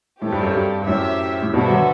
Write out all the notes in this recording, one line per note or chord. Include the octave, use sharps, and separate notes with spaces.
A2 A3 C4 G4
G2
F#2
G2
G2
F#2 A2 G4 C5 E5
A2
G2 B2 B3 F#4 A4 C5 E5
D3 F#3